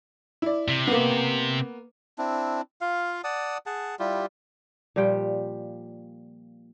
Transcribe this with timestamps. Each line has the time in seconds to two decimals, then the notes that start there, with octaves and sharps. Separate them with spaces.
0.42 E4 D5
0.68 C3
0.87 A#3 B3
2.18 C4 D4 E4
2.81 F4 F5
3.24 D5 F#5 A5 D#6
3.66 G#4 F#5 A5
3.99 G3 E4 F4 G4
4.96 A#2 F3 G3 G5